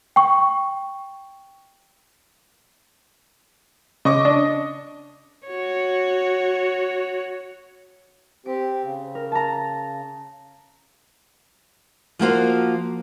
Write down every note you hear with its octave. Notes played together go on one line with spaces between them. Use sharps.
G5 C#6
C#3 D#5 C#6 D6
D4
F#4 C#5
C4 G4 D7
C#3
A#4
A5 A#5
F3 A#3 F#4 C5